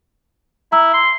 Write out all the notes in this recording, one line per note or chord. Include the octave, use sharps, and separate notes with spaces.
E4 A#5 E6
C6